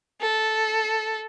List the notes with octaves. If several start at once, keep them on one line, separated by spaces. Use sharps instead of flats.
A4